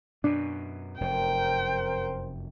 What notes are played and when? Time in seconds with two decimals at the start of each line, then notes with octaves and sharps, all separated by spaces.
0.24 F#2 B2 D4
1.01 F1 F#2 A#4 C5 G5